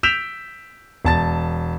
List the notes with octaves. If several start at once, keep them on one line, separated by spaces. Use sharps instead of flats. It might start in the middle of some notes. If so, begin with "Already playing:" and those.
E6 G6 B6 D7 E7 F7
E1 A5 A6